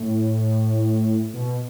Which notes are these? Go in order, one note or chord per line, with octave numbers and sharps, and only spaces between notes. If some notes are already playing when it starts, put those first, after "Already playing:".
Already playing: A2
B2